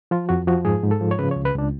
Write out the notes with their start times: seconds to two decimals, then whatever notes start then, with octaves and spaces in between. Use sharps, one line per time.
0.11 F3 F4
0.29 F2 F#4
0.47 F3 F#4
0.65 G#2 G#4
0.83 G#2
0.91 A4
1.01 F3
1.11 C#5
1.19 C#3 B4
1.31 C#5
1.36 C#2
1.45 B4
1.55 C#2 D4